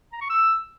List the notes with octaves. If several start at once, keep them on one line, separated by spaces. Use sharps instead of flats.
A#5
C#6
E6